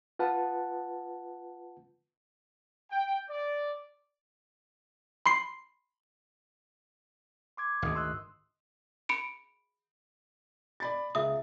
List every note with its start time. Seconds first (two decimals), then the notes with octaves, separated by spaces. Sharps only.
0.19 F4 B4 F#5 A5
2.91 G5
3.29 D5
5.26 B5 C6 C7
7.57 C6 D6 G#6
7.82 G#1 D2 D#5 D#6
7.95 C6 E6 F#6
9.09 B5 C#7 D7
10.80 D5 B5 A6
11.15 C#2 G#4 E5 D#6